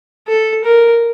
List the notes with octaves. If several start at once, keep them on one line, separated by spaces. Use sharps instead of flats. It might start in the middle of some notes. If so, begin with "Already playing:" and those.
A4
A#4